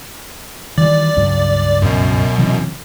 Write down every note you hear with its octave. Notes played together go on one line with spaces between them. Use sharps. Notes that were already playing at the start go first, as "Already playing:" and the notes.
D#3 E3 G3 D5
C#2 G2 F#3
F#2 B2
C3 E3 F#3